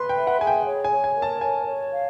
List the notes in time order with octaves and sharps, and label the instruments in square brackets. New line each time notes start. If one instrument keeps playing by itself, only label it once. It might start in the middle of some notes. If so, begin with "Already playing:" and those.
Already playing: [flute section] B4 [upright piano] C6
[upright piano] G5
[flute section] E5
[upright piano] F#5
[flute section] G#4 [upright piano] G#5
[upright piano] G5
[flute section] C#5
[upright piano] G#5
[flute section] C#5
[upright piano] G#5
[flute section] A#4
[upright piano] A5
[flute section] C#5 [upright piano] G#5
[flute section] C#5
F5